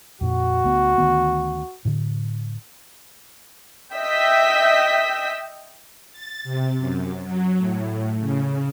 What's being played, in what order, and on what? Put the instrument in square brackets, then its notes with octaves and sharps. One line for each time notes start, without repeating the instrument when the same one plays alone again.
[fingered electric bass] F2 A#2 [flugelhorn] F#4
[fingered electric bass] D2 B3
D2 D#3 B3
A2 D3
[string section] D#5 E5 G5 E6 G6 B6
[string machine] A6
C3
F#2
F#3
A2
C#3